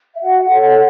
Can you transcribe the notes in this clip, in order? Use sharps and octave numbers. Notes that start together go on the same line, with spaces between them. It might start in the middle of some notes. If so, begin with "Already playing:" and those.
E5
F#4 F#5
A4 C#5